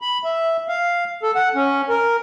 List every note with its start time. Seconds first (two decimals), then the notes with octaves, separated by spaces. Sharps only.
0.01 B5
0.24 E5
0.68 F5
1.23 A4
1.35 F#5
1.55 C#4
1.89 A#4